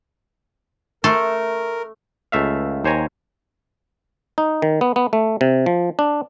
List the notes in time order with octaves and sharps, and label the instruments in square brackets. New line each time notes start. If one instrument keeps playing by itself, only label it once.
[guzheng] A3 A4 C6 [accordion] A#4
[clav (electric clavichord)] C#2 A3 E5 F5
D#2 C5 C#5 G#5 A#5
D#4
D#3
B3
B3
A3
C3
F3
D4